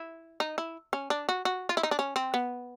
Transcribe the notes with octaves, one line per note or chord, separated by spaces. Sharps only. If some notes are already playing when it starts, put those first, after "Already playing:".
Already playing: E4
D#4
E4
C#4
D4
F#4
F#4
F4
E4
D#4
D4
C#4
C4
B3